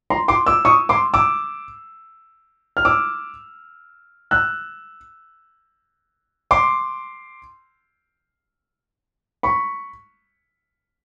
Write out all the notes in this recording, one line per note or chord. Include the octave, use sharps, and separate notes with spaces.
A#5 C6
C6 D6
D6 E6
C#6 D#6
C6 D6
D6 E6
F6
D6 E6
E6 F#6
C6 D6
B5 C#6